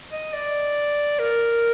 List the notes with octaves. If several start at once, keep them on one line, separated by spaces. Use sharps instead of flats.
D#5
D5
A#4